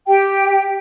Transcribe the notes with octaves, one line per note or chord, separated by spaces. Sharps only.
G4 G5